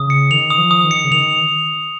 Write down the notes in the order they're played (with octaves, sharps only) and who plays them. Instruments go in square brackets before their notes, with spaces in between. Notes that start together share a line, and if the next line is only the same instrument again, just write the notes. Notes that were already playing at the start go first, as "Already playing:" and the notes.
Already playing: [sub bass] C#3 [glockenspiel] D#6
[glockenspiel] C#7
[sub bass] D#3 [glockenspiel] F7
[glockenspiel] D#6
[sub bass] F3
[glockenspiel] D#6
[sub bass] D#3
[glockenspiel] C#7
[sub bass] C#3
[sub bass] D#3 [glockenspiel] F7